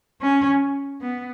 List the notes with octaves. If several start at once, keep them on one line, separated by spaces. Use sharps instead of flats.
C#4
B3